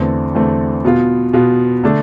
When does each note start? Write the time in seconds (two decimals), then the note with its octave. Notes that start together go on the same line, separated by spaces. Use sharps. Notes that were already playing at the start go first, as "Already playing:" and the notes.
Already playing: E2 D3 A3 C4
0.35 E2 D3 A3 C4
0.85 B2 B3 F4
1.33 B2 B3 F4
1.84 D3 A3 D4